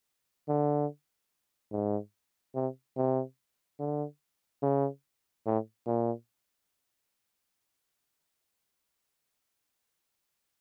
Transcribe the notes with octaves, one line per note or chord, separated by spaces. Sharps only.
D3
G#2
C3
C3
D3
C#3
A2
A#2